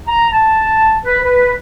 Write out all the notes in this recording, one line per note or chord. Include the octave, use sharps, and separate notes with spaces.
A#5
A5
B4
B4